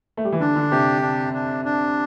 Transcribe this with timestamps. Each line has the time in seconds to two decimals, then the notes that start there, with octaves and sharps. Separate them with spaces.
0.17 A3
0.25 G3
0.32 E3
0.40 D3 D4
0.56 D3
0.71 C3 G4
1.02 D4
1.34 D4
1.65 D4